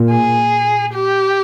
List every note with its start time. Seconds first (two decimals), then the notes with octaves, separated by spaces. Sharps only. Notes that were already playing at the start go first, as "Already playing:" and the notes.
Already playing: A#2
0.10 G#4
0.94 G4